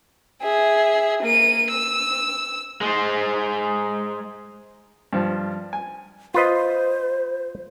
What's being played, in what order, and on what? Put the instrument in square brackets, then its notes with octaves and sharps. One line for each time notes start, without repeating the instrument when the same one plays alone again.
[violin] G#4 E5
A#3 D#7
E6
[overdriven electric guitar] G#3 C5
[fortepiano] G2 F3
G#5
[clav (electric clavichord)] F4 B4 D#5 [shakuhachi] C5